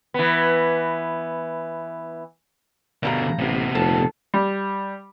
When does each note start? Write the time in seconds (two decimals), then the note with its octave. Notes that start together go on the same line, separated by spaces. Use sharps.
0.14 E3 B3
3.03 G2 B2 D3 A4 A#5
3.39 A1 C3 B3
3.75 F1 A4
4.34 G3